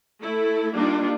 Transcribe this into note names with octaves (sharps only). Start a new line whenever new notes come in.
A3 E4 A4
G3 A#3 D4 D#4 F4